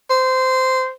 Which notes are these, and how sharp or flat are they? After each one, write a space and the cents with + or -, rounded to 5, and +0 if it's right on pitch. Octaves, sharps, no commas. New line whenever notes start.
C5 -15